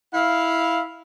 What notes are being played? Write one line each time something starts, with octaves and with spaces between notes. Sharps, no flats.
E4 F5